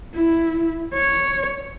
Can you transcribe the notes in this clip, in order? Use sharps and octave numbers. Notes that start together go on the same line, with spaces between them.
E4
C#5